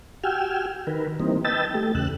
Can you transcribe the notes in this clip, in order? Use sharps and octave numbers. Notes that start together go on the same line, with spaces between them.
F#4 G4 G5 G#5 E6 F6
D#3 A#4 B4
E3 G3 A#3 C4 D#4
B4 D#5 G5 A5 E6 A6
A3 G4
E2 C#3 E6 F#6